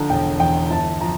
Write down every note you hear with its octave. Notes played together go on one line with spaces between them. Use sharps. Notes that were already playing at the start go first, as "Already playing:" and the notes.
Already playing: D3 F3 A#5
E1 G5
E2 G5
G1 A5
F3 A#5